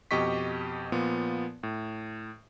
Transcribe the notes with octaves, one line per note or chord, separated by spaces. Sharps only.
F2 B2 G4 D#5 C#6 B6
A#2 F3 B3
A2